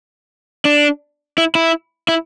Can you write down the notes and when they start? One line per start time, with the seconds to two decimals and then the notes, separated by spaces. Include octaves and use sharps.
0.65 D4
1.38 E4
1.55 E4
2.08 E4